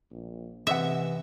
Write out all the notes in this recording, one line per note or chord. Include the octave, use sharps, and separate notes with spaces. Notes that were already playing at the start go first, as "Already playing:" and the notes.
A#1
C3 E3 B4 D#5 E5 F#5